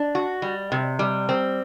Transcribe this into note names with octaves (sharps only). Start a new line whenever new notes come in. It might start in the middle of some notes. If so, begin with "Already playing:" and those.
Already playing: D4
F#4
G3
C3
G3
C4